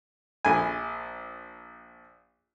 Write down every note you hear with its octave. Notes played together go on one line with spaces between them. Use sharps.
A#1 G#5